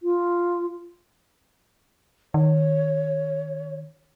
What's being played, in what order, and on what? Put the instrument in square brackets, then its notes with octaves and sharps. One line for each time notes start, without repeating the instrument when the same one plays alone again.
[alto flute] F4
[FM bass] D#3 [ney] C#5